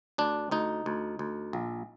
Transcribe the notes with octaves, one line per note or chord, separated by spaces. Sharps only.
D2 D4
D2 D#4
D2
D2
A#1